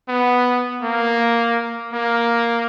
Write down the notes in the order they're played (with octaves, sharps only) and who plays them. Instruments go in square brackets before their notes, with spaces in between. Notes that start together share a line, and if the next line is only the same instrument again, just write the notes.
[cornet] B3
A#3
A#3